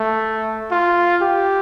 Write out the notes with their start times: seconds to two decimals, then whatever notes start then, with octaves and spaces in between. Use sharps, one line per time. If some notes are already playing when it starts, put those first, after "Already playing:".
Already playing: A3
0.71 F4
1.22 G4